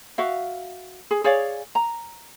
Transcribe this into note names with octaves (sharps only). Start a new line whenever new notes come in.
F#4 E5 F5
G#4
G#4 C#5 D5 F5
A#5